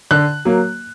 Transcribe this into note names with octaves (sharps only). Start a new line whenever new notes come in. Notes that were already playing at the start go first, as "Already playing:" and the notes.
D3 F#6
F#3 A#3